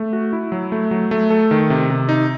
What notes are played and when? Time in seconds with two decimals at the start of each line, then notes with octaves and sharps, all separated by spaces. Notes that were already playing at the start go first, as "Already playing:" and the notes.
Already playing: A3
0.13 F#4
0.33 E4
0.52 F#3
0.72 A3
0.91 F#3
1.11 A3
1.30 A4
1.51 D#3
1.70 C3
1.90 C3
2.09 D#4